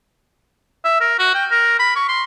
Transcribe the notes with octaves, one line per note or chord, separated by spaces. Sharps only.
E5
A#4
F#4
G5
A#4
B5
C#6
C6